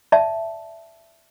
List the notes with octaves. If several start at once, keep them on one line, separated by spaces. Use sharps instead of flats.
D5 E5 A5